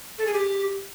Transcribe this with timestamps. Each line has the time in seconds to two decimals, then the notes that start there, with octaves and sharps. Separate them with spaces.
0.18 A4
0.26 G#4
0.33 G4